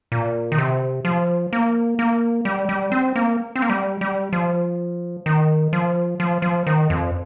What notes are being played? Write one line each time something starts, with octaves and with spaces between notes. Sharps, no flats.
A#2
D#3
C3
F3
A#3
A#3
G3
G3
C4
A#3
C4
A#3
G3
G3
F3
D#3
F3
F3
F3
D#3
F2